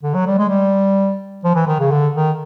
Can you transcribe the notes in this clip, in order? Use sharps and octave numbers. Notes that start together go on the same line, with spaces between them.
D3
F#3
G3
G#3
G3
F3
E3
D#3
C#3
D3
D#3